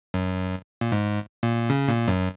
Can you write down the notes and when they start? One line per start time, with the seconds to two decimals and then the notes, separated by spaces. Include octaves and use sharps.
0.14 F#2
0.81 A#2
0.92 G#2
1.43 A#2
1.70 C#3
1.89 A#2
2.08 F#2